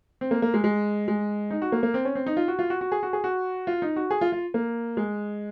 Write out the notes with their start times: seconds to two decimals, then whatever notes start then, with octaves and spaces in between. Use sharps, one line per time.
0.21 C4
0.31 A#3
0.42 A#3
0.54 G#3
0.64 G#3
1.08 G#3
1.51 D#4
1.62 F#4
1.72 A#3
1.83 A#3
1.94 C4
2.05 C#4
2.15 C4
2.26 D#4
2.37 F4
2.48 F#4
2.59 F4
2.70 F#4
2.81 F#4
2.92 G#4
3.03 F#4
3.13 G#4
3.24 F#4
3.67 F4
3.82 D#4
3.96 F#4
4.11 G#4
4.21 F4
4.32 F4
4.54 A#3
4.97 G#3